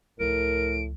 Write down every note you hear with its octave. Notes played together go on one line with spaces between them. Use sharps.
C#2 A2 F3 A#4 D7